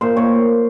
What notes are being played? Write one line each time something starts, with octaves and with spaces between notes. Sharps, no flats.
A#2 C5
A#2 C#5